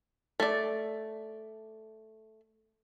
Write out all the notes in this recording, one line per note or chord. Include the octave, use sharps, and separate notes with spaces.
A3 D5